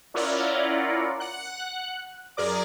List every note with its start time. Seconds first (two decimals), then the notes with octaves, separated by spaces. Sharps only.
0.14 C#4 E4 F4 A#4 D5 F#5
1.20 F#5 F#6
2.37 F#2 G#4 A#4 D5 D6